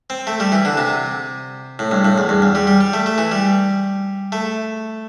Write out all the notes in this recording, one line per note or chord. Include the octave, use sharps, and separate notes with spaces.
C4
A3
G3
E3
D3
C3
A2
G2
A2
E2
G2
E2
G3
G3
G3
A3
A3
E3
G3
A3